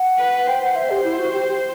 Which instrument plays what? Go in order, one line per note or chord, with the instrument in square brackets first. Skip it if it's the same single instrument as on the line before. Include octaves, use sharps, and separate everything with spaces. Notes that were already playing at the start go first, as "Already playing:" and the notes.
Already playing: [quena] F#5
[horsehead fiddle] B4
[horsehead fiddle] C5 [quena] G5
[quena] F#5
E5
G4
E4
F#4
G4
G4